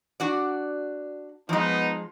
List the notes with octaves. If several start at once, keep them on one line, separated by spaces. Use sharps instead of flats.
D4 F#4 D5
F3 G#3 B3 D#4